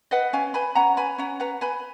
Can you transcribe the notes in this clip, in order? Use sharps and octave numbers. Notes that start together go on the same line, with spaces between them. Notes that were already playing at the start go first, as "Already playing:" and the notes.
B4 D#5 F#5
C#4 F5 G#5
B4 G#5 B5
C#4 F#5 A#5
B4 G#5 B5
C#4 F#5 A#5
B4 F#5 A#5
B4 G#5 B5